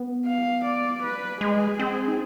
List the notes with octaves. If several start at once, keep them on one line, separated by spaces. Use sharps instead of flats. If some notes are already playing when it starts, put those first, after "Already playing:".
Already playing: B3
F5
D5
B4
G#3 G#4
C4 G#4
D#4